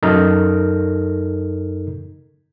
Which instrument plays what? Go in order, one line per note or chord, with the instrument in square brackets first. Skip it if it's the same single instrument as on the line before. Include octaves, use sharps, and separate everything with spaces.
[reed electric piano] F#2 D#4 A4 A#4 A#5 F6